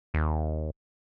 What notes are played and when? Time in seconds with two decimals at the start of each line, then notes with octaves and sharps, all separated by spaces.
0.14 D#2